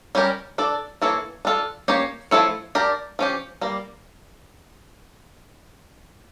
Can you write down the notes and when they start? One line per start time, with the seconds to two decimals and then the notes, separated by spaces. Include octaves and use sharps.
0.15 G3 C#4 G4 A#4
0.58 D4 A4 D5
1.02 E3 A#3 E4 A4 C#5
1.45 D4 F4 A4
1.88 A#3 C#4 G4 C#5
2.31 F3 A3 E4 A4 C#5
2.75 D4 G4 A#4 D5
3.19 F3 C#4 G4
3.61 G3 A#3